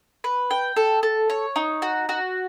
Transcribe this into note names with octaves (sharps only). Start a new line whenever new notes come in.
B4
G5
A4
A4
C#5
D#4
F#4
F#4